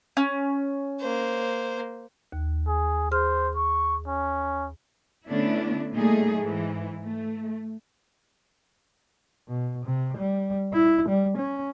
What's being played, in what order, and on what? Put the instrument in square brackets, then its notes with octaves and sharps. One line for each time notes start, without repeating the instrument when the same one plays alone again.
[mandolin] C#4
[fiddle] A#3 C5
[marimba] D#2
[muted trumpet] G#4
[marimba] G#4 F6 [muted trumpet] C5
[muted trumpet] C#6
C#4
[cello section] D3 A3 B3 C#4 D4 E4
A#2 G3 A3 D#4 G#4
G#2 E3
A3
[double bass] B2
C3
G3
E4
G3
C#4